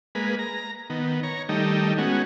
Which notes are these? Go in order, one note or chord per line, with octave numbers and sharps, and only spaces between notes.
G#3 A#3 B4
A#5
D#3 B3
C#5 A#5
D#3 G3 A3 D#4
G#3 B3 C#4 F#4